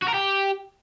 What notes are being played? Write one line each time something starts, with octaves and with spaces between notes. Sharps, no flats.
F#4
A#4
G4